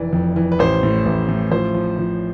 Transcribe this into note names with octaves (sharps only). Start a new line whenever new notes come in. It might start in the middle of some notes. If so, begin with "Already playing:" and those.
Already playing: F1 E3 D5
F2
E3
B4
A1 C5
A2
A1
A2
F3 C5
F3
F3